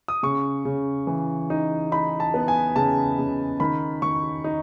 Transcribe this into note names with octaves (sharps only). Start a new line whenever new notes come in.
D#6
C#3 C#6
C#3
E3
D#4
D#4 B5
A5
B3
G#5
C#3 A5
C#3
D#3 B5
D#3 C#6
D#4